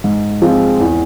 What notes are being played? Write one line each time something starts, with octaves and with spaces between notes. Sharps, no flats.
G#2
F3 G#3 C4 F4
E2